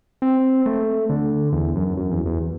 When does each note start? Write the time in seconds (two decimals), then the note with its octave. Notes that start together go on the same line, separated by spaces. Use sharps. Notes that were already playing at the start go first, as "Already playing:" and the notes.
0.22 C4
0.66 A3
1.09 D3
1.53 E2
1.75 F#2
1.97 F#2
2.11 E2
2.25 E2